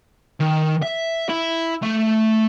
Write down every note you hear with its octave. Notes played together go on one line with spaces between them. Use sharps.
D#3
E5
E4
A3